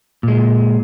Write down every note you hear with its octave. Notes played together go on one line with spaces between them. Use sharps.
A#2 G#3